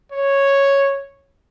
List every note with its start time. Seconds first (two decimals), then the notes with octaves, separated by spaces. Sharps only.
0.12 C#5